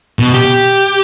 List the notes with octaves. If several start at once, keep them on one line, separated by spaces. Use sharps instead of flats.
B2
G4